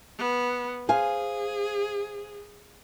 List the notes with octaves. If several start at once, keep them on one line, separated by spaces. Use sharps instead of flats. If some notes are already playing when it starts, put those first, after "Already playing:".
B3
G#4 C5 F5 G#5